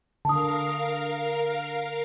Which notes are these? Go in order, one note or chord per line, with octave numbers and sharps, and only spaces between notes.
D3 A#4 F5 A5 D#6